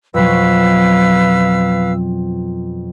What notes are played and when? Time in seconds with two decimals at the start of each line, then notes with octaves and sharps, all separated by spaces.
0.14 F2 B2 F#3 B4 F5 E6